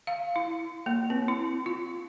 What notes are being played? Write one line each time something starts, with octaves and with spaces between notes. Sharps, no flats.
F5
E4
A#3
C4
E4
F4